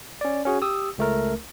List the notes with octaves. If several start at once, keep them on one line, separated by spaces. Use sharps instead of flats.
C#4 D5
C#4 F#4 G#4
G4 D#6 E6
C#2 A3 A#4